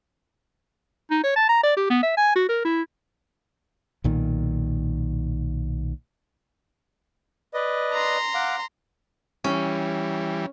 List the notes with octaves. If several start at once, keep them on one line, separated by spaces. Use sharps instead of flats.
D#4
C#5
A5
A#5
D5
G4
B3
E5
G#5
F#4
A#4
E4
B1 A#2 D#3
B4 D5 D#5
A#5 C6
F5 F#5 D6
E3 G3 C#4